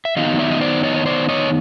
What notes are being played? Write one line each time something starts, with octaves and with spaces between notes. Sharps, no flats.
E5
D#3 F#3 B3 D#4 D#5 F5
D5 E5
D#5
C5 D5
C#5 D#5
C#5
C5 D5
C#5 D#5